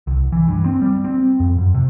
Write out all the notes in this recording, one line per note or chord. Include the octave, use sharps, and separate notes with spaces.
C2
E3
G2
C4
G3
C4
F2
F#2
C3